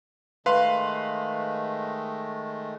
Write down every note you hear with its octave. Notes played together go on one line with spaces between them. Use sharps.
D#3 G#3 A3 B4 F5 C6